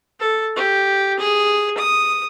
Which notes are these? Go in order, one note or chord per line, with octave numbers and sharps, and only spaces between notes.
A4
G4
G#4
D#6